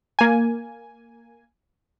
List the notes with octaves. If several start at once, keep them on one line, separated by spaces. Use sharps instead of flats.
A#3 G#5